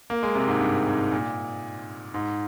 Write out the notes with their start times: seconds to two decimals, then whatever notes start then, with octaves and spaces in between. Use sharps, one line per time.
0.10 A#3
0.23 G#3
0.35 C3
0.48 G#2
0.60 G2
0.87 G#2
1.12 A#2
2.14 G#2